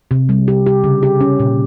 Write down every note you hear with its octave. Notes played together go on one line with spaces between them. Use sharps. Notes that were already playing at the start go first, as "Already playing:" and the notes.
C3
G3
G4
G4
C#3
G4
C#4
A#2